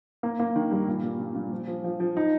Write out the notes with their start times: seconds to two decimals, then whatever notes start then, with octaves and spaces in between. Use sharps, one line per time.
0.23 A#3
0.39 A#3
0.56 D#3
0.71 G2
0.88 A#2
1.03 A#2
1.20 A#2
1.35 A#2
1.52 F3
1.68 F3
1.84 F3
2.00 F3
2.17 D#4